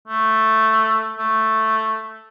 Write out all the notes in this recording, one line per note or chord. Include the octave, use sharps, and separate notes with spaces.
A3
A3